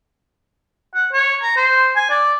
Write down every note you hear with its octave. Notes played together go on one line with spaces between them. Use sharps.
F#5
C#5
A#5
C5
G#5
D5